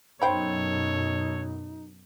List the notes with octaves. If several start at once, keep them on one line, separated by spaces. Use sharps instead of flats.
F#2 B2 D#4 A4 C5 C#5 G5 B5